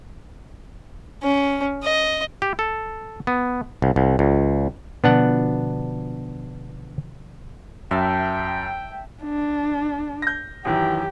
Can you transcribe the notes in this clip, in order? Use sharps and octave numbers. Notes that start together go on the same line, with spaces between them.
C#4
D#5
G4
A4
B3
C2
C2
C#2
B2 D3 F3 B3 D4 F#5
F#2 E5 G5 A5
D4
G6 A#6
F#2 D#3 E3 G4